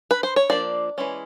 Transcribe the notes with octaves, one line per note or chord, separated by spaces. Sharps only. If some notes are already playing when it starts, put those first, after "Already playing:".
B4
C5
C#5
F3 A#3 D4 D5
E3 G#3 C#4